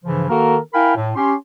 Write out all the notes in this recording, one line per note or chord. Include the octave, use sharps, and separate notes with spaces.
G2 C#3 E3 F3
D#3 A#3 F#4 A4 A#4
E4 A#4 F5 G5 G#5 B5
A2
C#4 G4 C6